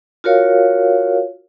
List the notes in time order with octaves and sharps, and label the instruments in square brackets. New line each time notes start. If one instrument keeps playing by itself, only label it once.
[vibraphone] F4 F#4 A#4 C#5 F5